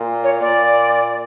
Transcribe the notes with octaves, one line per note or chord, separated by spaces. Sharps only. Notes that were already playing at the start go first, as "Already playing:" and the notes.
Already playing: A#2
C#5
A#2 D5